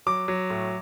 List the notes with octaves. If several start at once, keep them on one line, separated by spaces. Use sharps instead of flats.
F#3 D6
F#3
A2